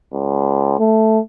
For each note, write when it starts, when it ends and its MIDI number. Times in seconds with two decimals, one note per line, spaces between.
0.13 0.77 37
0.79 1.19 57